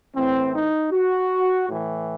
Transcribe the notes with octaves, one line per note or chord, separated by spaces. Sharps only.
A2 E3 C4
D#4
F#4
A2 E3